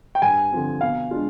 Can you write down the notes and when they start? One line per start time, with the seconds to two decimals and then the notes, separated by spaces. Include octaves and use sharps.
0.15 G5
0.22 G2 G#5
0.52 D3 F3 C4
0.81 B2 F5
1.11 G#3 D4 F4